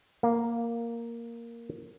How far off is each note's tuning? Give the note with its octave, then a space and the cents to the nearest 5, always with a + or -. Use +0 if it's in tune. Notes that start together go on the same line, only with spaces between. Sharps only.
A#3 +0 F5 +0